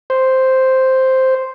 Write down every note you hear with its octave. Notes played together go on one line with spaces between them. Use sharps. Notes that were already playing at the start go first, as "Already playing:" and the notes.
C5